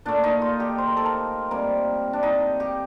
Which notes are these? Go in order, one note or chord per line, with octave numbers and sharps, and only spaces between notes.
A#2 A3 D4
D#4
F4
G4
C5
A#4
A4
A#4
C3 G3 A#3 A#4
D4
D#4
G4